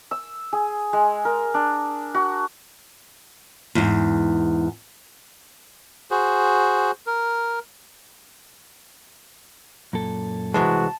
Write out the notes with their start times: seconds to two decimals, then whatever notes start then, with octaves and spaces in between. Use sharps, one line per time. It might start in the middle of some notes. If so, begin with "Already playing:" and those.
0.11 E6
0.53 G#4
0.93 G#3
1.25 A#4
1.54 D4
2.14 F#4
3.75 E2 G#2
6.11 F#4 G#4 C5
7.07 A#4
9.93 F#2 A#2 A4
10.54 C2 E3 G#3 F#4 A5